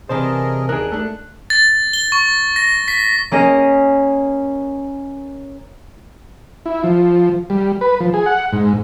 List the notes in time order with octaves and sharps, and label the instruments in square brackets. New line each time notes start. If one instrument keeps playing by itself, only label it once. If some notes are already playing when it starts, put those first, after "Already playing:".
[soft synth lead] C3 [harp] E3 D4 A5 [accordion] G#4 A#4 D#5 [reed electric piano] C5
[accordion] D#2 [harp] D4 D#4 [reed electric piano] G#4 A#4 [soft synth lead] F#6
[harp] A3 D4 [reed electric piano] A4
[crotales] A6
G7
C#6
A#6
B6
[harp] A#3 C#4 G#4 D#5 A#6
[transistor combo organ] E4
F3
G3
B4
F3
G#4
F#5
G#2